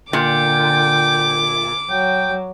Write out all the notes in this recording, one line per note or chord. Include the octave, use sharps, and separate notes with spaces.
A#2 D3 G5 D6
F#3 G5